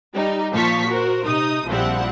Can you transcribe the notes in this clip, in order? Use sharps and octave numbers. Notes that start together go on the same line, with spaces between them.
G3 D#4
A#2 F3 F5 A5 C#6 B6
F#4 A#4 C5
C3 D#4 D#6
A#1 F3 G3 C4 E4 F#5